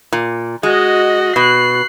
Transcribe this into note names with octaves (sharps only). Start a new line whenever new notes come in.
A#2
G#3 F#4 D#5
B2 F#6 C7